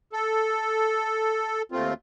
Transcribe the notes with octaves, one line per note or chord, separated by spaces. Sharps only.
A4
D#2 A3 C4 F4